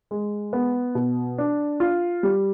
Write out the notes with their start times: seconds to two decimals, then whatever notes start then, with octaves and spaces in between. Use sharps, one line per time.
0.11 G#3
0.53 B3
0.95 B2
1.38 D4
1.80 F4
2.23 G3